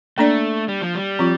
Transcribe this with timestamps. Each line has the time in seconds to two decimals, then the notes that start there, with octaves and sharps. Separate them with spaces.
0.18 A3 A#3 D4 A4 D5
0.68 G3
0.82 F3
0.95 G3
1.19 F3 C4 F4